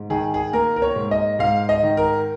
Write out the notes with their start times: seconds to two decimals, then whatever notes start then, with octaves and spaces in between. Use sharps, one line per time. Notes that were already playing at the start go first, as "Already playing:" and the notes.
Already playing: G#2
0.10 D#3 G#4
0.34 G#4
0.53 A#3 A#4
0.76 A#4
0.82 C#5
0.96 G#2
1.11 D#5
1.39 G#2 F5
1.69 D#5
1.83 D#3
1.97 A#4